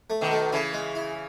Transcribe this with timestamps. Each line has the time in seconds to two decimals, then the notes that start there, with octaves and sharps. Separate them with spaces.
0.10 A3
0.21 B2 D#3
0.31 A3
0.52 C#3 E3 E4
0.73 G#3
0.95 E4